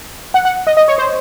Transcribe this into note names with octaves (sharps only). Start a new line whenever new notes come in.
F#5
F#5
D#5
D#5
C#5
C5